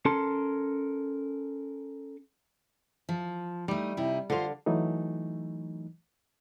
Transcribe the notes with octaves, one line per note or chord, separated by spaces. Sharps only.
C#4 A4 A#4 A5 C6
F3
G3 A3 D#4
C3 D#4 E4
D3 F4 C5 F5
E3 F#3 A3 D#4